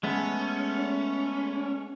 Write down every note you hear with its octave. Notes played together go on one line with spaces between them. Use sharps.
G#3 A3 B3 C#4